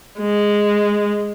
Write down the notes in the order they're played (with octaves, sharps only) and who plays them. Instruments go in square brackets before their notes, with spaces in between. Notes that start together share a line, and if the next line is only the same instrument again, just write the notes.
[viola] G#3